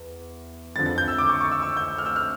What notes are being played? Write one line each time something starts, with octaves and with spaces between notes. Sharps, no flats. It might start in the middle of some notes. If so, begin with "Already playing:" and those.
Already playing: E2
F2 D3 F3 A6
A6
G6
E6
D6
C#6
C#6
E6
E6
G6
F6
E6
F6